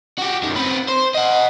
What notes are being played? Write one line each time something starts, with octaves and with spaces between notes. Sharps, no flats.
F#4 G4
F#2 D#3
C4 B4
C5
D#5 F#5